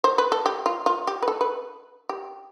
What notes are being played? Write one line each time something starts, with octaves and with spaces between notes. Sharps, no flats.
C5
B4
A4
G4
F4
F4
G4
B4
A4
B4
G4